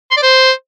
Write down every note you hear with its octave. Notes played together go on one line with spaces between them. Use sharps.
C6
D5
C5